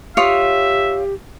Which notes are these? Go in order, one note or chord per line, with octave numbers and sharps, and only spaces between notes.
F4 G4 C#5 E5 D#6